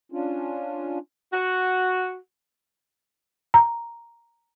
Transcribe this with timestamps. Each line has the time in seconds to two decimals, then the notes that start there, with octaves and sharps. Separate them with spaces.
0.12 C#4 D4 F4
1.33 F#4
3.54 A#5